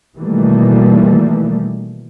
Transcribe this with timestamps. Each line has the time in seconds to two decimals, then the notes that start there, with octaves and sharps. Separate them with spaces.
0.16 B2 D#3 E3 G3 A3 A#3